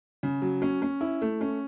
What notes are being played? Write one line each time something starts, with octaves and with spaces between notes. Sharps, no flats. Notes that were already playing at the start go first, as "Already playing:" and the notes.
C#3
F#3
C#4
C#4
E4
A3
C#4